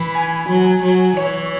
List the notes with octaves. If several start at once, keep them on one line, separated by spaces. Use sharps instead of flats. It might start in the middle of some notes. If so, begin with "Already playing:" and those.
Already playing: E3 B5
G#5
F#3
F#3
E3 C#5